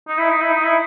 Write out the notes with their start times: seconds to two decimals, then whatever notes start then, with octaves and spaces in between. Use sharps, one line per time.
0.08 D#4
0.18 E4
0.30 D#4
0.41 E4
0.52 D#4
0.64 E4